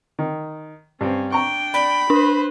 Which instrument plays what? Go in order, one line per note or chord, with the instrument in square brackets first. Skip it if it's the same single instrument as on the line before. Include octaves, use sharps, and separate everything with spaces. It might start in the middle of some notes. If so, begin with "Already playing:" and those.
[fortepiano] D#3
[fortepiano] G2 C4 [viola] C#4
[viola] D4 G5 [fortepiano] A#5 C#6
[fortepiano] D5 [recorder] B5
[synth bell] D4 [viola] B4 C5